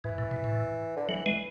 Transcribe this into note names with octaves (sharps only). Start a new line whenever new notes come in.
G#2 E3
A2
B2
A2
D3
E3 F#3
E3 G#3